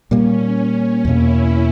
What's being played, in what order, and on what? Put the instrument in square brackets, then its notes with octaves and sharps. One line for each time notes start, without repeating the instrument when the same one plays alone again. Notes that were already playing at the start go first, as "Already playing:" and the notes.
[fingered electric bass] A#2 G3 A#3 [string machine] C#4
[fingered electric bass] E2 B2 A#3 [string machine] E4